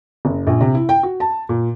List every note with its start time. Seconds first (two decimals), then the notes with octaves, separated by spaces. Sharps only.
0.25 F#1
0.47 A#1
0.61 C3
0.75 E4
0.89 G5
1.03 F#4
1.20 A5
1.49 A#2